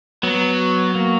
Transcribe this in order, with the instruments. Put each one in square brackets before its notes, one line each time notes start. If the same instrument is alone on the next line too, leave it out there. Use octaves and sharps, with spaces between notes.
[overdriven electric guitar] F#3 [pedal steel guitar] B3
[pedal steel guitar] A#3